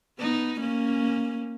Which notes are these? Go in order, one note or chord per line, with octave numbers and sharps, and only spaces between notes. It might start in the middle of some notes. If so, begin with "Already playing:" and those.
B3 D#4
A#3 C#4